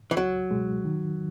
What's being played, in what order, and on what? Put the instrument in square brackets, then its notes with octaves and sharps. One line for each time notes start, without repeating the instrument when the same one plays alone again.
[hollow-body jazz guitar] E3
[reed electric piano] C#2 [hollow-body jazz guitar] F#3
[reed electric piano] B2 G#3
D#3